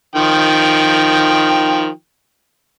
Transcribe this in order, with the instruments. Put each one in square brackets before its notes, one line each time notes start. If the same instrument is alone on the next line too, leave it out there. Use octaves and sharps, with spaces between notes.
[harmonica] D#3 F3 G5